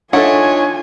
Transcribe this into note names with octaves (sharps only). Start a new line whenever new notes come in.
D4 D#4 F4 A4 C#5 E5 F#5 G#5